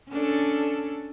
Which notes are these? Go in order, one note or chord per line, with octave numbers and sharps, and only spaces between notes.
C#4 D4 A4